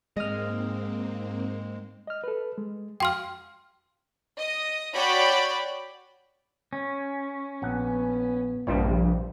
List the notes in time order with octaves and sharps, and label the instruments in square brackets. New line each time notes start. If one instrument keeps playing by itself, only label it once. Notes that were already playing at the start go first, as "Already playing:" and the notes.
[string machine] G#2 A#3 C4 [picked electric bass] G#3 [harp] D#5 F6
[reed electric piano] D#5 F6
A4 B4
G#3
[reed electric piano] F2 F#4 F5 [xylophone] G5 C6 F6
[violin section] D#5
F#4 C#5 D5 G5 B5
[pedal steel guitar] C#4
[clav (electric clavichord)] A#1 F#5 [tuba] B3
[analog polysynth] A#1 G2 [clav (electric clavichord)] C3 G3 F4